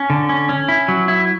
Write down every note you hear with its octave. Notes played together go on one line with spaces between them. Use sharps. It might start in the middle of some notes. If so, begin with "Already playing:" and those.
Already playing: C#4
D3
C#4
C#4
E4
F#3
E4